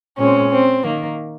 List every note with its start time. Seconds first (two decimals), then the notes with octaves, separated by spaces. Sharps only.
0.19 A#2 G#3 C4 C#4
0.51 C4
0.84 D#3 A#3